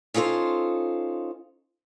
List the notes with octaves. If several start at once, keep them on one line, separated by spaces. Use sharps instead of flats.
C#4 D#4 F4 A4 C5